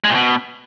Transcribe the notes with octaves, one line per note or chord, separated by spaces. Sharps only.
G#3
A#2
B2